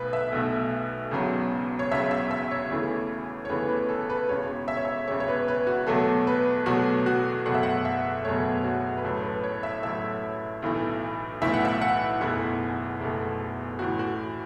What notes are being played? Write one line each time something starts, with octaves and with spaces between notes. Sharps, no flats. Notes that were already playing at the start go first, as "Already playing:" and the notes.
Already playing: B1 B2 A3 B4
E5
B1 B2 A3
E1 E2 C#3 F#3
C#5
E1 E2 C#3 F#3 E5
E5
E5
C#5
E2 C#3 E3 A3
C#5
E2 C#3 E3 A3 B4
B4
A4
B4
E1 E2 C#3 C#5
E5
C#5
E5
E1 E2 C#3 C#5
C#5
B4
B4
F#4
E2 B2 F#3 A3 A4
B4
E2 B2 F#3 A3 F#4
F#4
F#1 E2 B2 F#3 A3 F#5
E5
F#5
E5
F#1 E2 B2 F#3 A3 C#5
F#4
B4
A1 A2 F#3 A4
B4
C#5
E5
A1 A2 F#3 E5
B1 A2 E3 A3
B1 A2 E3 A3 E5
F#5
E5
F#5
F#1 E2 B2 A3 E4
F#1 E2 B2 A3
A1 A2 E3 F#4
F#4